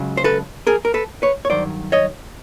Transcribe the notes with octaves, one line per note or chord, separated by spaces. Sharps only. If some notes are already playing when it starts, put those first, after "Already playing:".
Already playing: C#2 C#3 F#3
C5
A4 B4
G#4 A#4
A#4
A4 B4
B4 C#5
C#5
G2 D#3 F#3 C5 D5
C#5 D#5